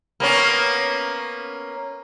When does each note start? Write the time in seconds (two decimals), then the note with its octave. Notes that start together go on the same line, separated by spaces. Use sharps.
0.20 A#3 B3 C#4